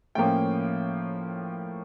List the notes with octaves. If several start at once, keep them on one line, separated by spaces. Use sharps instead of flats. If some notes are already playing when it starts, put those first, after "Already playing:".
A2 F3 A#3 C#4 G5